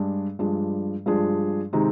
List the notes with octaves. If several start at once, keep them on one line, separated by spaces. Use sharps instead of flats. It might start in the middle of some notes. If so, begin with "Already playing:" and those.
Already playing: G2 G#3 D4 G#4
G2 F3 G#3 D4 G#4
G2 F3 G#3 D4 G#4
C3 D#3 G#3 C4 D#4